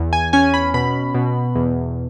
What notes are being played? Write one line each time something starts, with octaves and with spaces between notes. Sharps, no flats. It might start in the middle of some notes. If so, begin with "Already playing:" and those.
Already playing: E2
G#5
C#4 G#5
B5
B2 B5
B2
E2